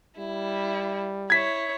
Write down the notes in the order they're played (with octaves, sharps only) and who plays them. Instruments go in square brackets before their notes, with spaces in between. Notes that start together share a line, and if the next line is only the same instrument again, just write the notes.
[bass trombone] G3 [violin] E4
[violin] E4 C#5 [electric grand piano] G#6 B6